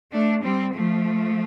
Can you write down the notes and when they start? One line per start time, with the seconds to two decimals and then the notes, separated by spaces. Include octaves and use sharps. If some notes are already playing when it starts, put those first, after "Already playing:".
0.12 A3 D4
0.43 G3 C4
0.72 F3 A3